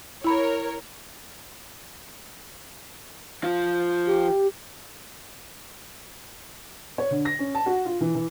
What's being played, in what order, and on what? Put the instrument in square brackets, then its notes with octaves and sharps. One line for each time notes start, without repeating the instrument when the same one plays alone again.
[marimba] E4 B5 [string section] A#4 C#5
[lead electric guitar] F3 F4
[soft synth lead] G4
[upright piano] C#5
D3
A#6
C#4
A5
F#4
F4
E3
E3